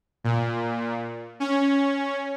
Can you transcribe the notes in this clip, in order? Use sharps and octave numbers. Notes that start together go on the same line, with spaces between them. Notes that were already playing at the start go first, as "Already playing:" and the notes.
A#2
C#4